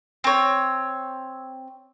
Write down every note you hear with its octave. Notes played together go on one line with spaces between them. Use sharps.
C4 C#5